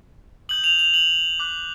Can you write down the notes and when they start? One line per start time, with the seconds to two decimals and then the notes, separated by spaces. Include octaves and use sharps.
0.49 D#6 G6 F#7
0.64 F7
0.79 F7
0.94 F#7
1.40 D6 F#6